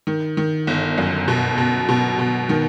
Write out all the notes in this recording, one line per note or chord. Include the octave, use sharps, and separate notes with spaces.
D#3
D#3
G1
F#2
B2
B2
B2
B2
D#3